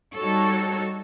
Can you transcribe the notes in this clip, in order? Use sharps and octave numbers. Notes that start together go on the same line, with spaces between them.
G3 D#4 F#4 A4 C#5